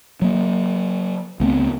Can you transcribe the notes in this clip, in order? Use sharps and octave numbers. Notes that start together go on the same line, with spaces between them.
F#3 A#3
C#2 A3 B3 C4